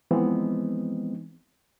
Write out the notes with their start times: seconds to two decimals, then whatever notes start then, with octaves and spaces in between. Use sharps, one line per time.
0.11 E3 F3 G#3 B3 C4 D#4